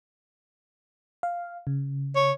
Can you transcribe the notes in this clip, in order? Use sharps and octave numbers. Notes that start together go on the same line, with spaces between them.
F5
C#3
C#5